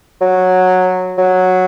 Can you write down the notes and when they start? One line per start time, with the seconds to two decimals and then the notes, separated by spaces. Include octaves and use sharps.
0.21 F#3
1.18 F#3